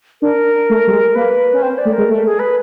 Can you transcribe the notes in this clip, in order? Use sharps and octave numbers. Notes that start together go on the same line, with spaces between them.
D4 A#4
A3
G3
G#3
A#3 B4
C#4
C4 C5
D5
A3
A#4
G#3
A3
G#4
B4